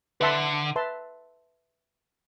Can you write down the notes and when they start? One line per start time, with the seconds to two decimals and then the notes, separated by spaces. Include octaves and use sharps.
0.20 D3 B4 E5 A5 C6
0.76 B4 E5 A5 C6